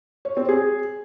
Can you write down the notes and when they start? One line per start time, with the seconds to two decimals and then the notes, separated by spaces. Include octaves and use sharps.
0.25 C#5
0.37 C4
0.49 G#4